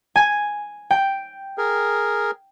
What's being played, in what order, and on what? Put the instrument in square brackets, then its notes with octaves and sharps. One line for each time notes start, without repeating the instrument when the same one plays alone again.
[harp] G#5
G5
[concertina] G#4 A#4